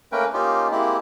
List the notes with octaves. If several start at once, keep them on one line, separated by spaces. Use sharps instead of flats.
A3 A#3 C#4 A#4 B4 G5
A#3 C#4 D#4 F4 G4
G#3 A#3 C4 E4 G4